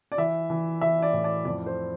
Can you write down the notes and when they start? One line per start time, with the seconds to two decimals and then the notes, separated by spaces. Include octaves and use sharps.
0.12 D5
0.18 E3 E5
0.50 E3
0.81 E3 E5
1.02 D5
1.13 A2
1.24 D5
1.45 F2 D5
1.66 C5